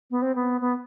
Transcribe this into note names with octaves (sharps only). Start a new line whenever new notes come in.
B3
C4
B3
B3